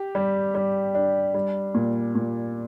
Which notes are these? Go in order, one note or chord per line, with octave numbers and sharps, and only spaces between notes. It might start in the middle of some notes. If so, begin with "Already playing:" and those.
Already playing: G4
G3
G3
D4
G3
A#2
A#2